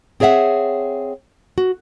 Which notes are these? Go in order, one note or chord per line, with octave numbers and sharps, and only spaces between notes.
C4 G#4 C#5 E5 F#5
F#4